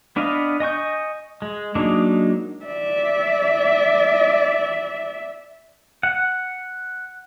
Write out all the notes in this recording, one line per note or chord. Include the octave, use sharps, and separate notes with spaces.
B3 D4 B4 D#5 F5
D#5 G#5 C#6 G6
G#3
F#3 G#3 A#3 D4 D#4
D5 E5
F#5